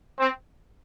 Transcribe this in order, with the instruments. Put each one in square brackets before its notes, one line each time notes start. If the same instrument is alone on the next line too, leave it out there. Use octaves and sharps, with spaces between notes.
[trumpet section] C4